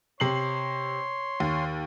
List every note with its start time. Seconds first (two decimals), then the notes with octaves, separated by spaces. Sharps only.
0.20 C3 C#5 C6 C7 F#7
1.40 D#2